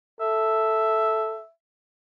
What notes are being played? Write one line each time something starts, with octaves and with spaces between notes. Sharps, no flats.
A4 E5